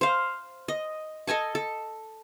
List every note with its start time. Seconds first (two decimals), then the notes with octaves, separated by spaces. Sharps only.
0.01 C5 F5
0.68 D#5
1.27 A4 D#5 G#5 A5
1.55 A4